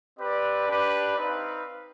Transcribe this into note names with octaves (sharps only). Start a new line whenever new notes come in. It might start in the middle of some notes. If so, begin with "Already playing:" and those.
C4 G4 B4 D5
D4 G4 B4 D5
C4 D#4 B4 F5